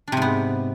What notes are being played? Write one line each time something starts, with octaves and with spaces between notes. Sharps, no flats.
G#2 C3 B3 D4